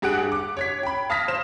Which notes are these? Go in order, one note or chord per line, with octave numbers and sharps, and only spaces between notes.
G2 G4 G#4 F#5 F#6 D7
D6
C#5 G#6 B6
G5 B5
F5 A5 D#6 F6 A#6 B6
C5 E7